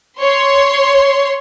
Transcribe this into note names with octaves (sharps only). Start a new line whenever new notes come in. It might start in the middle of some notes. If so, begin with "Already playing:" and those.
C#5 C6